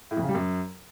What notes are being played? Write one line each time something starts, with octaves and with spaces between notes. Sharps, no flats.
A2
F2
C#3
G3
F#2